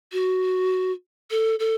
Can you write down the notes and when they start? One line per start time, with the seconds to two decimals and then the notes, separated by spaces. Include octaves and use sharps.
0.12 F#4
1.31 A4
1.60 A4